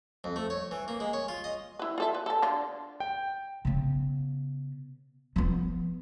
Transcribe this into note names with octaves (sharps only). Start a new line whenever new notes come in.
F2
A3
C#5
E3
A#3
G#3
C#5
F4
D#5
E4 B4
F4 A4 E5
B4
A4 A5
D3 D4 F4
G5
C#3 B3
F3 B3